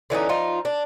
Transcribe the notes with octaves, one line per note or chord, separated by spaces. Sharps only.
D3 E3 C#4 D#4
F3 D#4 F4
D4